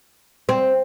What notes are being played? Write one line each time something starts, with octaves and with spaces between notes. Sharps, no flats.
C4